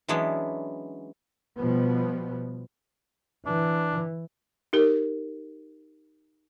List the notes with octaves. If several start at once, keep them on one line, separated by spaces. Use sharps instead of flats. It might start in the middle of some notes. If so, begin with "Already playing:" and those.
E3 F#3 G#3 B3 C#4 D4
B2 F3 G3 B3
E3 D4
D#4 G4 A#4